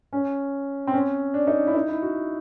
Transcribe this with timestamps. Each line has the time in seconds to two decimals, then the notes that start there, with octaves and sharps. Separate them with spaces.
0.13 C#4
0.87 C4
0.94 C#4
1.34 D4
1.47 D#4
1.67 E4
1.75 D#4
1.88 E4
2.02 F#4